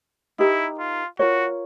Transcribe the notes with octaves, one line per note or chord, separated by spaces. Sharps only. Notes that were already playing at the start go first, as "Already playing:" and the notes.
D#4 E4 G4 A#4
F4
F4 F#4 A#4 C#5